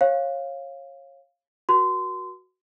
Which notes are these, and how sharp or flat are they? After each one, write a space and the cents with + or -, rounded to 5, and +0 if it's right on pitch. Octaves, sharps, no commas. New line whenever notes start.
C#5 -25 F5 +0
F#4 +0 A#4 +40 C6 -25